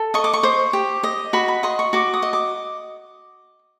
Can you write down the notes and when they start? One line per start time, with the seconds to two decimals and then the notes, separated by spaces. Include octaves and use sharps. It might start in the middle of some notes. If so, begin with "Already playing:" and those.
Already playing: A4
0.14 D#5 C#6
0.24 D6
0.33 C#6
0.43 C5
0.73 G4
1.03 D#5
1.33 F#4 B5
1.48 B5
1.63 D#5 C6
1.79 C#6
1.93 F#4 D6
2.14 D#6
2.23 D#5
2.33 D6